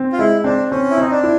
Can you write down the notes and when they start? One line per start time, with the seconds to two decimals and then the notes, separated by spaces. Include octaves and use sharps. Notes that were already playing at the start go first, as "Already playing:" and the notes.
Already playing: C4
0.12 F4
0.18 G#3 E4
0.44 C4 D4
0.71 C4 C#4
0.90 E4
0.98 C4 D#4
1.11 D4
1.23 E4